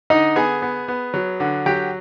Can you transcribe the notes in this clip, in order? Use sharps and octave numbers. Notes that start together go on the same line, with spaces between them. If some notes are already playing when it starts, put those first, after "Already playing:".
D3 D#4 D#5
B3 G#4 G#5
B3
B3
F#3
D3
F#3 G4 G5